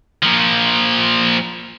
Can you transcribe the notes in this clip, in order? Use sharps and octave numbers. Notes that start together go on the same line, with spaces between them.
A#2 F3